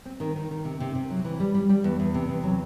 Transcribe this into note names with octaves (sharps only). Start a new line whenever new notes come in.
C4
D#3
D#3
D#3
C3
C3
C3
F#3
E3
G3
G3
G3
E2
E2
C3
E2
F#3